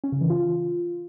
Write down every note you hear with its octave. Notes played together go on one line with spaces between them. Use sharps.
C#4
C#3
E3
F4